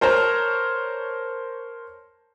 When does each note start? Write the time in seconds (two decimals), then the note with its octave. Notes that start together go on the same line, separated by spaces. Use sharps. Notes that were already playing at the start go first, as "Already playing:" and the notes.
0.01 A#4 C5 C#5 A5 A#5